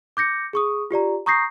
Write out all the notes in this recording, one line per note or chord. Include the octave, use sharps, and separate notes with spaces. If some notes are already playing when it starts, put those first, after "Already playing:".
D6 G6 A#6 C#7
G#4 C#6 D#6
F4 G4 D5 A#5
A#5 C#6 D#6 G6 A#6 C7